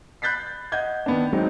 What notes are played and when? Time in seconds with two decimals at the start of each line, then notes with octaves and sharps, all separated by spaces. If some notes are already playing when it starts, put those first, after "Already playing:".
0.22 B5 F#6 G6 A6 B6 C7
0.72 D#5 F#5 G6 G#6
1.06 D#3 B3 D4
1.33 F#3 G#3 C4 D#4